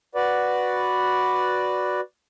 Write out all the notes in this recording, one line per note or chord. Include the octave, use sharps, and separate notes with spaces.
F#4 B4 D5